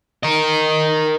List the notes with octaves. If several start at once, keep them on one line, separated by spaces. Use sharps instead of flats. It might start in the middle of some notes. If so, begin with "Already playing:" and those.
A#4 D#5